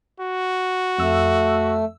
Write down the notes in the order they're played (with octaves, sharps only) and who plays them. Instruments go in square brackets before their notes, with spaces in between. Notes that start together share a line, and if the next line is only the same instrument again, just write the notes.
[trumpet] F#4
[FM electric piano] F2 E6 [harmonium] A3